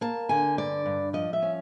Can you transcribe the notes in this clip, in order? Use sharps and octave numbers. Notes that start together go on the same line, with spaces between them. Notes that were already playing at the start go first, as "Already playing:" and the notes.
A#3 A5
D3 G#5
G2 D5
G2
F3 D#5
E5
C#4